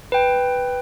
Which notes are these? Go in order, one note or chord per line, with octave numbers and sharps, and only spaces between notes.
B4 G5